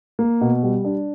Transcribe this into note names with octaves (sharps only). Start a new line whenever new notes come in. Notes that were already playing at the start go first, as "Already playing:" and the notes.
A#3
B2
G3
D4